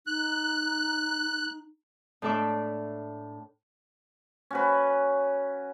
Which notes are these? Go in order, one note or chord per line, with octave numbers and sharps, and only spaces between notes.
D#4 F#6
A2 A3 D4 A4 E5 D6
C#4 F#4 B4